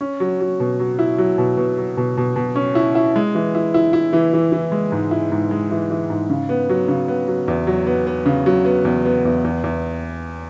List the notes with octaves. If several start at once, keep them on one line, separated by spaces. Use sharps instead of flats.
C#4
F#3
F#3
B2
F#3
E4
F#3
B2
B2
F#3
B2
B2
B2
C#4
E4
E4
G#3
E3
E4
E4
E4
E3
E3
E3
G#3
G#2
E4
G#2
G#3
E3
E3
G#2
C#3
B3
F#3
C#3
B3
F#3
E2
F#3
B3
B3
C#3
F#3
B3
E2
B3
E2
E2
E2